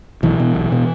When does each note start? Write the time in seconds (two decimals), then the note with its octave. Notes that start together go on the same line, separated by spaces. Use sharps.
0.23 B1 E3
0.40 B2
0.55 B1
0.72 B2